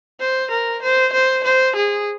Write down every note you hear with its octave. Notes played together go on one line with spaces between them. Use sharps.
C5
A#4
C5
C5
C5
G#4